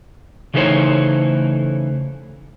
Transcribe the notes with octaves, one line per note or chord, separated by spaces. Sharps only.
C#3 E3 A3 D#4 C5 C#5